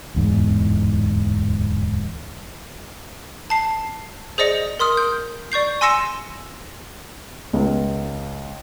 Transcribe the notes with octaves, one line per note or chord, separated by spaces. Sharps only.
D1 E2 G#2
A5 C7
G#4 C5 D5 D#5 A#6 C#7
A#4 C6 D#6 F6
G6
D5 C#6 G6 C7
G#5 C6 E6 A#6 C#7 E7
C#2